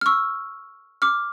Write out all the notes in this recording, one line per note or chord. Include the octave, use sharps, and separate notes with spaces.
F6
C#6 E6
D6 F6